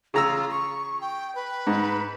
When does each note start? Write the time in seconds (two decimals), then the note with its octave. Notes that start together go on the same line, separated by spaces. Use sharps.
0.14 C#3 F4 A#5 E6
0.51 C#6
1.01 G5
1.35 B4
1.67 G#2